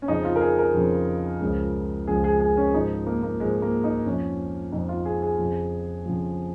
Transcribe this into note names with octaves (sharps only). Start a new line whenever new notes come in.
C#4
F2 C#3 F3 D#4
F4
A#4
G#4
A#4
F2 C#3 F3
C#2 C#3 F3
C#2 C#3 F3 G#4
G#4
G#4
C#4
G#2 F3 D#4
A#3
A#3
G#2 F3 G#3
A#3
D#4
F2 F3 C#4
F2 F3 D#4
F4
G#4
G#4
F2 C#3 F3
F2 C#3 F3